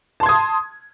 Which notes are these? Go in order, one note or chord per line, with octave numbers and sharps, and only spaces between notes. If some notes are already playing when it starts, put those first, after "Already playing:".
A5 C6 D#6 G#6